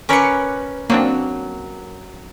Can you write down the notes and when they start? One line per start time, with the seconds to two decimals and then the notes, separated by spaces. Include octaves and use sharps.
0.09 C#4 A#4 B4 D6 C#7
0.90 F#3 A#3 C4 D4